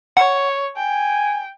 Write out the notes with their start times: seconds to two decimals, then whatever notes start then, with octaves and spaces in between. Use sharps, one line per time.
0.17 C#5 F#5
0.77 G5 G#5